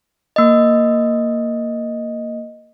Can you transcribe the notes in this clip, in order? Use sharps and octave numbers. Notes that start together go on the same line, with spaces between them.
A#3 D#5